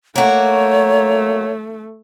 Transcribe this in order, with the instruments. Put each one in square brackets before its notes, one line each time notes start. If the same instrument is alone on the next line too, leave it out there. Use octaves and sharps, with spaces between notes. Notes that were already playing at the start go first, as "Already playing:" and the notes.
[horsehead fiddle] A3 [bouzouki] A#3 F#4 [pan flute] C#5